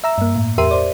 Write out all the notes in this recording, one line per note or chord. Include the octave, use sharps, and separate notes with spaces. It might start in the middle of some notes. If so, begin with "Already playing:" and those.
E5 A#5 E6
G2 A#3
A2
E2 G4 A#4 E5 C6 D#7
C5 D5